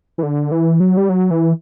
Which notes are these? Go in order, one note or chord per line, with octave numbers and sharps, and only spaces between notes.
E3
D3
E3
F#3
G3
F#3
E3